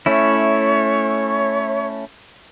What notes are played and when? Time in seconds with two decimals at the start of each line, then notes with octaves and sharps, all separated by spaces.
0.06 A3 C#4 E4 C#5